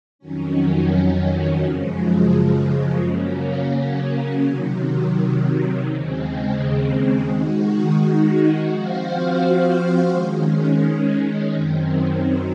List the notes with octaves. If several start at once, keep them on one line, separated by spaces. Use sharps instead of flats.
F2 D#3 F#3 C#4
F#2 C#3 F3 G#3
C#3 F#3 A#3 C#4
C3 D#3 F#3
D#2 C#3 G#3 C4
D#3 G#3 D#4 F#4
F3 C4 F#4 C5 F5
D#3 G#3 C#4
F#2 D#3 F#3 C4